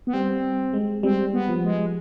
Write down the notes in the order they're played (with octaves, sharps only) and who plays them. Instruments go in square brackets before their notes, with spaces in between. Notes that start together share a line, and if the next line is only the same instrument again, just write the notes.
[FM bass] B3
[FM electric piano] G3 [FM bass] C4
[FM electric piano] G#3
[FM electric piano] G3 [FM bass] C4
[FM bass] B3
[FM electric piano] F3
[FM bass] G#3